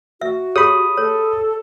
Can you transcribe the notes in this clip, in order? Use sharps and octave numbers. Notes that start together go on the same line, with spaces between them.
F#4 E5
G4 G#4 C#5 B5 D#6
A4 C#5